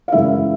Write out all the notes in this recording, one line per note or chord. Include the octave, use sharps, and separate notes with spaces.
F5
F#2 C#3 E3 G#3 E4 E5